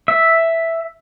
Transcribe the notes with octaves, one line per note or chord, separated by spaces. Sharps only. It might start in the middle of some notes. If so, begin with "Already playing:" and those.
E5